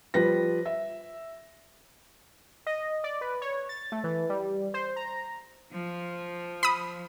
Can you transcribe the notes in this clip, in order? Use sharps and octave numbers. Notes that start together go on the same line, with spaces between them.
F3 G3 B4 A#6
E5
D#5
D5
B4
C#5
A6
A3
E3
G3
C5
A#5
F3
B5 D#6